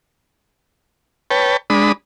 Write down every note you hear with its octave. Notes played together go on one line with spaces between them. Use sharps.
B4 C#5 G5 A5
G#3 D4 B5 D#6